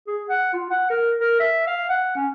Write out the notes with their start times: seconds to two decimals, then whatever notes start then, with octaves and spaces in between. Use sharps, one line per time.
0.07 G#4
0.29 F#5
0.53 F4
0.70 F#5
0.90 A#4
1.20 A#4
1.40 E5
1.67 F5
1.89 F#5
2.15 C#4